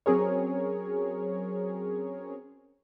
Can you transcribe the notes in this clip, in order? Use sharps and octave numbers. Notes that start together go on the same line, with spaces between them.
F#3 C4 C#4 G#4 A#4 C#5